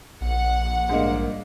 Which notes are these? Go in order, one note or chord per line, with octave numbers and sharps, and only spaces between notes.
A#1 F#5
G#2 G3 A#3 D4 D#5